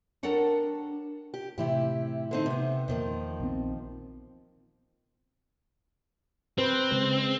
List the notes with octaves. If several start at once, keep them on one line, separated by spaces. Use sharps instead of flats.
D4 A4 A#4 C#5 F#5 G5
G4
A2 C3 E3 E4 G4
D3 C4 D#4
C3 B3
E2 A#2 D#3 F3 A#3
A#1 B3 C4
C4 B4 C5
C#3 G#3 C5